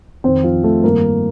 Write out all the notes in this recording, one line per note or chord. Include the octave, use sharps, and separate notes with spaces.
F2 D#3 C4 C5
F3 F4
A3 A4
G2 D#3 A#3 A#4